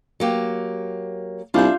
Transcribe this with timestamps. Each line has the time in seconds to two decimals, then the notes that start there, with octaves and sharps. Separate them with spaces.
0.20 F#3 A#3 G4
1.54 C2 D4 F4 E5 G6